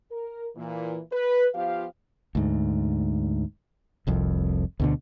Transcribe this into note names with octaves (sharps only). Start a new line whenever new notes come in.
A#4
A#2 E3
B4
F3 B3 F4 G4 C5 F5
D2 G#2
F1 C2 F2
D2 B2 D3